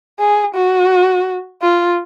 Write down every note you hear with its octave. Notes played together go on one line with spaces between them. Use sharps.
G#4
F#4
F4